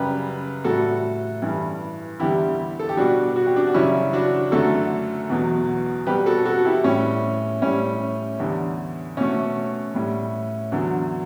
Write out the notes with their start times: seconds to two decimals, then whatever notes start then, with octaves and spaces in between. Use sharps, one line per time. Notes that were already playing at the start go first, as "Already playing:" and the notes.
Already playing: F#2 C#3 G3 G4 B4
0.64 A2 G3 F#4 A4
1.42 G2 E3 G3
2.20 E2 D3 G3 E4 G4
2.79 A4
2.89 G4
2.97 B2 G3 D4 F#4
3.36 F#4
3.46 G4
3.56 D4 F#4
3.67 F#4
3.74 F#2 C#3 G3 C#4 E4
4.13 D4 F#4
4.52 F#2 D3 A3 F#4 A4
5.29 E2 B2 F#3
6.07 B2 G3 G4 B4
6.26 F#4 A4
6.45 F#4 A4
6.65 E4 G4
6.84 A2 G3 C#4
7.62 A2 G3 C#4
8.39 E2 D3 G3
9.17 B2 A3 C#4
9.94 A2 G3
10.72 E2 D3 F#3